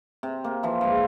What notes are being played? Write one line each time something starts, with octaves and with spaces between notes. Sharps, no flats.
C3
A#3
E3 F3 E4
G#2 F3